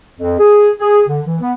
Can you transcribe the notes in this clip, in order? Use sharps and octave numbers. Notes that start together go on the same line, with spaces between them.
F2
G#4
G#4
D3
E3
B3